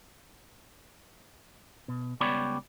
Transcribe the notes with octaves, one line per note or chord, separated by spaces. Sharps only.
B2
C#2 G3 B3 C#5 D5 B5